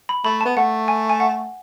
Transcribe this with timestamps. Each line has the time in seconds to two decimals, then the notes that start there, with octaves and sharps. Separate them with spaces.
0.09 B5
0.24 A3 B5
0.41 A5
0.45 B3
0.57 A3 F#5
0.88 G#5
1.10 G#5
1.20 F#5